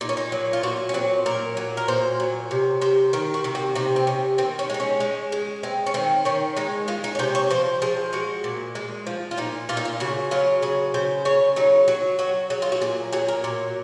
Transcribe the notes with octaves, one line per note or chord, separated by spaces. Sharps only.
A#2 D#4
C#4
D#4
F#3
F4
A#2 F#4
C#4
F#3 C4
A#2 A#4
F#3
A#4
A#2 C5
F#3
C3
C3 C5
D#3 A#4
F#4
C3
F#4
C3 D#4
C4
C3 C#4
D#3 C4
C#4
G#3 D#4
C#4
G#3
G#3
G#3 C4
C#4
D#3 C4
D#3 C#4
G#3 D#4
G#3 F4
D#4
C#5
C3 C5
C#5
F3 C5
F3 G#4
G#3 F#4
A#2
G#3
F3
F4
A#2 D#4
A#2 F4
D#4
F4
C#3 F#4
F#3 F4
C#3 G#4
C#3 C5
C#3 C#5
F#3 D#4
F#3 F#4
F#3 F#4
F#3 G#4
F4
F#4
A#2 G#4
F#3 G#4
A#4
A#2